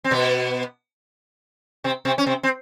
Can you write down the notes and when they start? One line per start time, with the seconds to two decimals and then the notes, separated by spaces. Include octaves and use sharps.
0.04 C4
0.11 B2 B3
1.84 C3 C4
2.05 C3 C4
2.18 C#4
2.26 C3 C4
2.43 C4